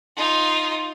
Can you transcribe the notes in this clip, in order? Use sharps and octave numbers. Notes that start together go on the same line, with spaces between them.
D#4 F4